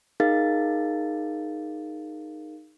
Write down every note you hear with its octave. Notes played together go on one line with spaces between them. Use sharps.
D#4 G#4 A#4 F5 A6